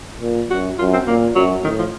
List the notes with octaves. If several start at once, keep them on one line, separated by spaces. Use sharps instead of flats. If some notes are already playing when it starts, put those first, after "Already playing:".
A#2
F#2 F#4
F#2 F4
C4
A#2 A#3
F#2 F#3
A2 D#3
F3